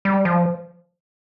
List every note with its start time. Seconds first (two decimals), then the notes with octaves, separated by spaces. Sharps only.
0.05 G3
0.25 F3